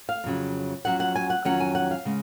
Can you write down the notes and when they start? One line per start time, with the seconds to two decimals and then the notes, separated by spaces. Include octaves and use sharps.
0.09 F5
0.24 F2 C#3 F#3
0.85 F2 D#3 F#3 C#4 F#5
1.00 F#5
1.16 G#5
1.30 F#5
1.45 F2 D#3 F#3 C#4 F#5
1.60 G#5
1.75 F#5
1.91 F5
2.05 C#3 G#3